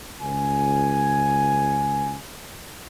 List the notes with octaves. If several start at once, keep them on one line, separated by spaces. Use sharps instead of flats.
C#2 G#5